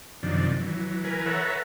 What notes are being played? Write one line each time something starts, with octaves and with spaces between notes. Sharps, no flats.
F#2 C3 D#3 F3 D4
E3 F#3
E3 A#4 B4 G#5
A4 B4 C#5 E5 F#5 A#5